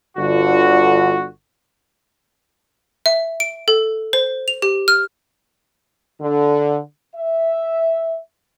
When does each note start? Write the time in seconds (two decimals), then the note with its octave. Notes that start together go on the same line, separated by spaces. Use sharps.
0.18 G1 D3 F4 F#4
3.06 E5
3.40 D7
3.68 A4
4.13 C5
4.48 F7
4.62 G4
4.88 F6
6.21 D3
7.15 E5